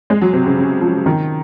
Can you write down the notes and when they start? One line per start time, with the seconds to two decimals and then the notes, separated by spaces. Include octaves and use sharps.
0.10 G#3
0.21 F#3
0.33 C3
0.46 C#3
0.58 C#3
0.81 F3
1.06 D#3